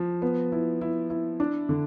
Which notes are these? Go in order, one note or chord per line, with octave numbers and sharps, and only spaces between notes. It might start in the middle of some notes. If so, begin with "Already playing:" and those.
Already playing: F3
B3
E4
E4
E4
D4
D3